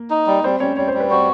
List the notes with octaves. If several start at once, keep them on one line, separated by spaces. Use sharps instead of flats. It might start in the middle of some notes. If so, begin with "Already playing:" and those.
Already playing: A#3
D#4
G3
G3 C4 C5
G3 C#4 C#5
G3 C#5
C5
G3
B4
C4 F#4 C5